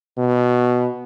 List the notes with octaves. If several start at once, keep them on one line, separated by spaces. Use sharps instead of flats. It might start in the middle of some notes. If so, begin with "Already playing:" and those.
B2